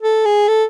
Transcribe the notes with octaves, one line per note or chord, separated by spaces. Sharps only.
A4
G#4
A4